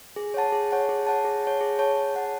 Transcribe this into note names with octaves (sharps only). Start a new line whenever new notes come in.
G#4
C#5 F#5 A5
G#4
C#5 F#5 A5
G#4
C#5 F#5 A5
G#4
C#5 F#5 A5
G#4
C#5 F#5 A5
G#4
C#5 F#5 A5